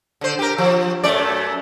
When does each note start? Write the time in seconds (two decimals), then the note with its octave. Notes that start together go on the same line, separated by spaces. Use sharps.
0.21 D3 C5
0.39 G4 A#4
0.58 F3
1.04 F#2 A3 D5